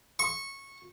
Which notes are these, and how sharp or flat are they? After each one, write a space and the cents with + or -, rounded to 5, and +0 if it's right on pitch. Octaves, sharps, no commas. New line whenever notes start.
C#6 -15